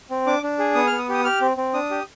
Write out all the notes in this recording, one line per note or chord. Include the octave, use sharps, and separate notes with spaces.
C4
D4 D6
D4
G#4
B3 D#6
B3 F6
D#6
G4 D#6
G4 F6
C4
C4
D4 D#6
G4